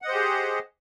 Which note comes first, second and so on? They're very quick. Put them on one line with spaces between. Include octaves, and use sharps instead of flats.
F#5 D#5 C5 G4 G#4